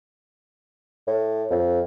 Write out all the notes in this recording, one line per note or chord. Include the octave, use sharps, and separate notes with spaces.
A2
F2